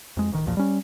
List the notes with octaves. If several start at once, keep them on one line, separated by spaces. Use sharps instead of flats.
F2 G#3
D1 D#3
B1 E2 A#2 F3
G3 C#4